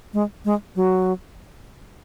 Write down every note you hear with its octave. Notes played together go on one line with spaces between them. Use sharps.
G#3
G#3
F#3